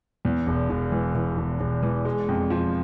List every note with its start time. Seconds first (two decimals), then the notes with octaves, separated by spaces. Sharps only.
0.25 E2
0.47 E1
0.69 E1
0.92 E3
1.15 E3
1.37 E1
1.60 E1
1.83 E3
2.05 G#3
2.29 F2
2.50 F3